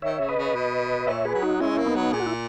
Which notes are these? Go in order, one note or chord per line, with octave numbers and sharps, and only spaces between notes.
D#3 C#5 E5
C#3
B4 D#5
C#3
B2
A#2 C#5 E5
G#4 B4
F#3
D#4 F#4
G#3 C#4 E4
A#3
B3 D#4
F#3
A#2 G#4
F#4
E4